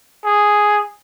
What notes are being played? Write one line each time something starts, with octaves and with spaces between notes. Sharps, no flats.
G#4